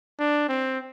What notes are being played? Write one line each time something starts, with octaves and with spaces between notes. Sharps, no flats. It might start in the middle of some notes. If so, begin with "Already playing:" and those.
D4
C4